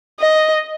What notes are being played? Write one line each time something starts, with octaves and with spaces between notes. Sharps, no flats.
D#5